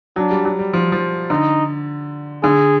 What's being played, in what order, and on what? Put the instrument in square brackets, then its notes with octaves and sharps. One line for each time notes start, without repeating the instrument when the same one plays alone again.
[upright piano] F#3 [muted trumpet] D4
[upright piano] G3
F#3
G3
F3
F3
[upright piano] D3 [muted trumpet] D#4
[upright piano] D3 [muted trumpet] G#4